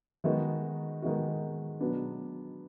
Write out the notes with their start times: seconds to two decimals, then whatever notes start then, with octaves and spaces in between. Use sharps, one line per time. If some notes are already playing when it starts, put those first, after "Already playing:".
0.24 D#3 G#3 B3 D#4 F#4
1.02 D#3 G#3 B3 D#4 F#4
1.80 B2 F#3 B3 D4